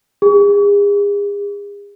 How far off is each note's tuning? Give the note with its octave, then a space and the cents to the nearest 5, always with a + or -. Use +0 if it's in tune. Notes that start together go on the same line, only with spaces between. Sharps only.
G#4 -40